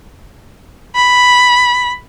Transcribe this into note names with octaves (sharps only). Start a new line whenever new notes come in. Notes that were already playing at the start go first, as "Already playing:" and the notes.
B5